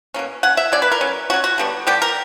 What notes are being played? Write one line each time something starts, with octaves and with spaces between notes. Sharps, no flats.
B2 A#3 C#4
F#3 C#4 F#5
E5
F#3 C#4 D5
B4
A#4
F#3 C#4
F#3 C#4 F#4
F#4
D3 G3 B3 D4
D3 G3 B3 D4 G4
A#4